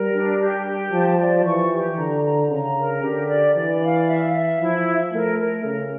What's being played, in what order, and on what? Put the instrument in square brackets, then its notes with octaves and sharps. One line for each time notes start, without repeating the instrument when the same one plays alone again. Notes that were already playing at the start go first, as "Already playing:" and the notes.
Already playing: [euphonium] G3 [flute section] A#4
[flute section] D4
G4
G4
[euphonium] F3 [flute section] A5
[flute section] D5
[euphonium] E3 [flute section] C#6
[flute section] G4
[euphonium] D3 [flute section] A#5
[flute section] A#5
[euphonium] C#3 [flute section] A#5
[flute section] A#4
[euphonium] D3 [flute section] G4
[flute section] D5
[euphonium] E3 [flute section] D5
[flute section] F5
E5
E5
[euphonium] F3 [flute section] E4
[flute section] E5
[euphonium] A3 [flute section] A#4
[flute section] A#4
[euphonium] C#3 [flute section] A#4